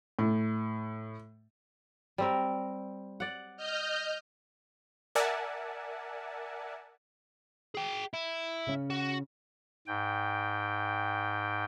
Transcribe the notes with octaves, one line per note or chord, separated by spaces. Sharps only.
A2
G3 C4 A#4
D5 F#5
D#5 F6 G6
A#4 D5 E5 F#5 G#5 A5
G#4 G5
E4
C#3 C#4
F#4
G#2 G5